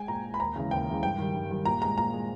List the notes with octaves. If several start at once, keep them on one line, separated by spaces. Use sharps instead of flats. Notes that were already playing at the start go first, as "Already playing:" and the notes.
Already playing: G#3 G5 G#5
A#2 A#5
G#3
B5
D#2 A#5
C#3 E3 G#3
D#2 G5
C#3 E3 G#3
G2 G5
D#3 G3
G2
D#3 G3
A#2 A#5
G#3 A#5
A#2 A#5
G#3